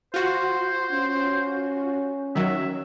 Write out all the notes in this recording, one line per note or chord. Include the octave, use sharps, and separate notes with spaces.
F4 F#4 C5
C#4
D#3 F#3 E5